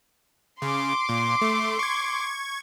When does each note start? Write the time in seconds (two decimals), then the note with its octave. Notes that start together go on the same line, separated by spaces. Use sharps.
0.62 C#3 C6 D6
1.09 A#2
1.41 A3
1.79 C#6 G#6